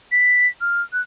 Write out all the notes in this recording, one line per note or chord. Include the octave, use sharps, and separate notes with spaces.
B6
F6
F#6